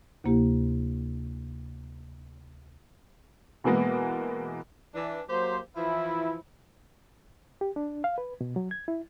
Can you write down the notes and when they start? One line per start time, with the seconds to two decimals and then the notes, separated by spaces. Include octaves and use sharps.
0.24 D2 C3 A#3 E4 G4
3.64 B2 E3 G#3 A#3 B3
4.94 E3 D4
5.28 F#3 A#3 G4 C5
5.76 E3 F3 E4
7.61 G4
7.76 D4
8.04 F5
8.18 B4
8.41 B2
8.56 F#3
8.71 G#6
8.88 E4